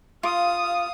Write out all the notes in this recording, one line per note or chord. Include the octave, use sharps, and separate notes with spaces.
F4 F5 D#6